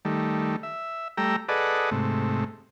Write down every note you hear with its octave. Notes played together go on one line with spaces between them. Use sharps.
D#3 G3 A3
E5
G3 A3 G5 A#5 E6
G#4 A4 B4 D5 D#5 F#5
G#2 C3 A3